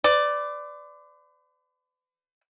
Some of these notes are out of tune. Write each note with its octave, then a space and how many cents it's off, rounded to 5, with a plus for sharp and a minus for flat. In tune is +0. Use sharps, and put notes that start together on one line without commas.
B4 +40 D5 +0